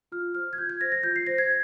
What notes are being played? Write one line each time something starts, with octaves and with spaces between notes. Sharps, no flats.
F4 F6
C5 F6
G#6
F4 G6
G#6
C5 A#6
A#6
F4 G6
C7
C5 A#6
G#6